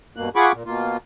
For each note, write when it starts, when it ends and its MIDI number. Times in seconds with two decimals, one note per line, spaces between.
0.16 0.29 43
0.16 0.29 47
0.16 0.29 58
0.16 0.29 90
0.36 0.52 65
0.36 0.52 68
0.36 0.52 78
0.36 0.52 83
0.36 0.52 85
0.36 0.52 86
0.52 0.63 46
0.66 0.97 47
0.66 0.97 58
0.66 0.97 65